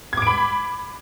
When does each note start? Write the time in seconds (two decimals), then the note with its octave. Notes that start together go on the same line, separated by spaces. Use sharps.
0.13 G#6
0.17 D6
0.22 D7
0.27 B5